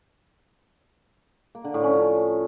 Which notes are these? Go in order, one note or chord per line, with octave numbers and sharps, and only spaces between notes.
A#3
D3
A2
C#4
F3